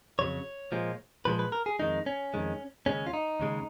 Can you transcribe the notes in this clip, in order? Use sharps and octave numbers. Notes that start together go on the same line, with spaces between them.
F2 C#3 F#3 C#5
A#2 F3 G#3
A#2 F3 G#3 B4
B4
A#4
G#4
F2 D#3 G#3 D#4
C#4
F2 D#3 G#3
D#2 C#3 G#3 C#4
F4
D#4
D#2 C#3 G#3